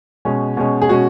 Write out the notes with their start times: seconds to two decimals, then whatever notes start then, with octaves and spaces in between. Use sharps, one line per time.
0.25 B2 G#3 C#4
0.57 B2 G#3 C#4
0.82 G#4
0.89 B2 G#3 C#4 F#4